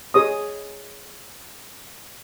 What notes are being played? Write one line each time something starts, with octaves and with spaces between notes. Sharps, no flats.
G#4 C#5 D#6